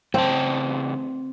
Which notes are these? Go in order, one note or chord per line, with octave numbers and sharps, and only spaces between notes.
A2 C#3 C4 A5